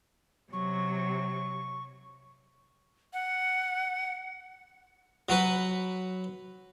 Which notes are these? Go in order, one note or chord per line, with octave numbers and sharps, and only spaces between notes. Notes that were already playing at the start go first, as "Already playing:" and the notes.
C3 F#3 C#6
F#5
F#3 F#4 B4